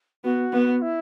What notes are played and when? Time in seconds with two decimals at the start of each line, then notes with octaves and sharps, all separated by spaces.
0.24 B3 F#4
0.53 B3
0.82 E4